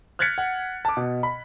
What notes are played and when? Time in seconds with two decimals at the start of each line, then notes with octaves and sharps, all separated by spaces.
0.19 F6 F#6 G#6 A6 B6 C#7
0.38 F#5
0.85 A5 D6
0.97 B2
1.23 B5